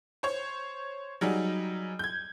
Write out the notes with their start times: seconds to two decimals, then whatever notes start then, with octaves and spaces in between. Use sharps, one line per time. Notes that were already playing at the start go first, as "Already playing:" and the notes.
0.23 C5 C#5 C#6
1.21 F#3 G3 D#4 G#4
1.99 G6 G#6